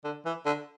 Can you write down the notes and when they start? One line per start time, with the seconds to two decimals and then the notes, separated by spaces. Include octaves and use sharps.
0.05 D3
0.26 E3
0.46 D3